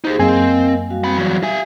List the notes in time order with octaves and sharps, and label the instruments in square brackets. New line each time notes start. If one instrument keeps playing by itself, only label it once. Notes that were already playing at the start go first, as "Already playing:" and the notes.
[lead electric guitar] D#4 G4 [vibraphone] G#4 C5
[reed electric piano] F#2 A#3 G#5 [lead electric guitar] C4 [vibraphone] A#4 D#5 F5
[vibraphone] G3 F#4 F5
[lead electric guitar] C4 B5
E2 F#3
[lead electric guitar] G4 G#5 [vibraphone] E5 F5